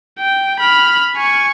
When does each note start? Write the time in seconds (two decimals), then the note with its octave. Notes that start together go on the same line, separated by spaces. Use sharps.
0.19 G5
0.60 B5 F6
1.15 G#5 C#6